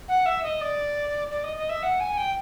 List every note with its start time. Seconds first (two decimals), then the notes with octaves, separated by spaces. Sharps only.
0.08 F#5
0.26 E5
0.43 D#5
0.61 D5
1.31 D5
1.43 D#5
1.57 D#5
1.69 E5
1.83 F#5
2.00 G#5
2.17 G5